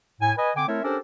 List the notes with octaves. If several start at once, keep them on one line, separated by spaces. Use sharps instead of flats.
A2 G#5
B4 D#5 G#5
D3 C4 G5 G#5 D6
A3 C4 E4 A#4 C#5 E5
C#4 D4 G4 A4 A#4 C5